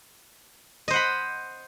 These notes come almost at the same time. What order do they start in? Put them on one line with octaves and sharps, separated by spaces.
D#5 C5 F#5 B5